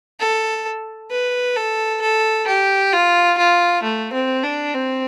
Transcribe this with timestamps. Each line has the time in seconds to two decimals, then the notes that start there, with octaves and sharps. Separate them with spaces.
0.20 A4
1.11 B4
1.56 A4
2.02 A4
2.47 G4
2.92 F4
3.38 F4
3.83 A3
4.13 C4
4.43 D4
4.74 C4